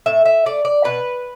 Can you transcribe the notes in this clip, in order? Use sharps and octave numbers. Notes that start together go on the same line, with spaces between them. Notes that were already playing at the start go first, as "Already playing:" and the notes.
A2 E5
E5
A3 D5
D5
B2 B4